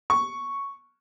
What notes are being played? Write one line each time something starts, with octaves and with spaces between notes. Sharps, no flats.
C#6